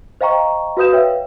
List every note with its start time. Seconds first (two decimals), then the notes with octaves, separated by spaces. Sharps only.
0.21 C5 D#5 F5 G5 A#5 C#6
0.77 F#4 B4 F5 D#6 G6 E7
0.93 B4 C#5 E5 F5 G5